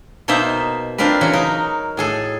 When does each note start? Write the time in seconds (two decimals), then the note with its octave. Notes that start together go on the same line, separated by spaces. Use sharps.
0.28 B2 A#3 D#4 C5 E5
0.98 C4 D4 F4 A#4 B4
1.21 C#3 E3 F#3 F#4
1.33 D#4 A#4
1.97 A2 G#4 A4